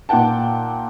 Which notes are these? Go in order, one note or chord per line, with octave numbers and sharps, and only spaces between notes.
A#2 D#4 F#5 G5 A5